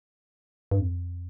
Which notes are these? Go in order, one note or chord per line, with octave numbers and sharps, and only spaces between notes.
G2
F2